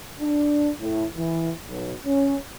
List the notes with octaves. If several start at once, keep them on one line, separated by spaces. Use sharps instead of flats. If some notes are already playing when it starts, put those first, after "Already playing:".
D4
A2
E3
B1
C#4